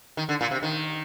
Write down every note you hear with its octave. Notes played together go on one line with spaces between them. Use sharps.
D#3
D3
A#2
C3
D#3